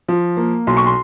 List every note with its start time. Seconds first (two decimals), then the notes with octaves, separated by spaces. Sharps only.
0.09 F3
0.37 A#3
0.67 B1 C6
0.77 C#6
0.86 C6